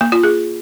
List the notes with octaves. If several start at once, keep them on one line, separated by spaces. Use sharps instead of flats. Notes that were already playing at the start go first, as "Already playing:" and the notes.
A#3
F4
G#4